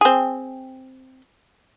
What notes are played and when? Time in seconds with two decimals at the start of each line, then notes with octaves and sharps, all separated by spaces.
0.01 C4 G#4